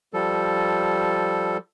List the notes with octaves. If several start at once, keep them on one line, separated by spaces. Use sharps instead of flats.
F3 G3 A4